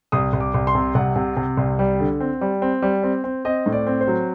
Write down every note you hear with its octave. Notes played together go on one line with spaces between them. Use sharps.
C2 D#6
C2
D6
C2
C6
C3
C2 F#5
C3
C3
C2
G3
D3
C4
G3
C4
G3
C4
C4
C4 D#5
A2
D5
C4
C5
F#3